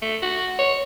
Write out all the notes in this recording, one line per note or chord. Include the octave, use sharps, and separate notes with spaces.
A3
F#4
C#5